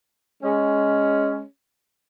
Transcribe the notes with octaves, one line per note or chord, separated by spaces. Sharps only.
G#3 C#4